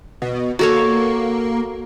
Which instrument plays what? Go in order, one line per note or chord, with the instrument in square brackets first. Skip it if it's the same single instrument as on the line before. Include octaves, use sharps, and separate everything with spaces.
[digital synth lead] B2
[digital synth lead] A#3 [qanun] F#4 A4 C#5